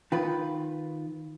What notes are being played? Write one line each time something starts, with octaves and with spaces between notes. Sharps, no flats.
D#3 F4 B4